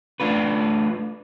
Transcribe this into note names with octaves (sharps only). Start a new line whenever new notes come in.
A3 D4 F4 B4